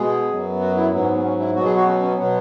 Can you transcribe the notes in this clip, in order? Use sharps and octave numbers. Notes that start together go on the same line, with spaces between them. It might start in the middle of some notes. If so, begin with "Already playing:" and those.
Already playing: B2 G#3 B3 G#4
F#2 F#3 B3
F#4
E4
G#2 F#3 B3
C#4
B3
C#4
E4
B2 F#3 B3 F#4
G#4
F#4
C#4
C#4
B2 F#3 B3